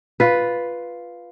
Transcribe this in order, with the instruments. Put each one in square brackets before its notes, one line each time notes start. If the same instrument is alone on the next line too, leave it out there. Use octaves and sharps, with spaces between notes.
[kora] F4 B4